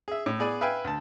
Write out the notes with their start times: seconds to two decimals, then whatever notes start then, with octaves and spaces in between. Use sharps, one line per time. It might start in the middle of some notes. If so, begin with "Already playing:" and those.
0.08 G#4 E5
0.26 A2
0.39 B3 G#4 D5 G#5
0.61 B4 E5 F5 G5 G#5
0.84 D2 A5